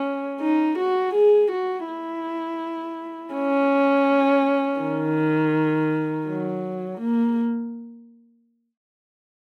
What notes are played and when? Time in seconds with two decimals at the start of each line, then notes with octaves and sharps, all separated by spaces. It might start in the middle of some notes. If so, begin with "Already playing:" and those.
Already playing: C#4
0.41 D#4
0.78 F#4
1.14 G#4
1.51 F#4
1.88 E4
3.35 C#4
4.81 D#3
6.27 F#3
7.01 A#3